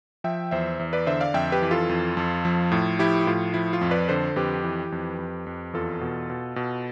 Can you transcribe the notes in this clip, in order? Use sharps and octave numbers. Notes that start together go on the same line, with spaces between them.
F3 E5 G5
E2 C5 E5
E2
B4 D5
D3 C5 E5
D5 F5
F2 E5 G5
G4 B4
E3
F4 A4
F2
F2
F3
A2
F3 E4 G4
A2 F4
F3 E4
F4
F2
B4 D5
D3 A4 C5
F2 G4 B4
E3
F2
F2
F2
E2 F4 A4
B2
B2
B2